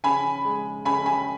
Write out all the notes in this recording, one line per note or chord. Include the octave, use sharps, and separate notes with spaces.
C#3 G#5 B5
G#3
C#3 G#5 B5
G#5 B5